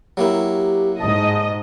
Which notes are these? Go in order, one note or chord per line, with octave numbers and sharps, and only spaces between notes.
F#3 A#3 E4 G4
G#2 D#5 A5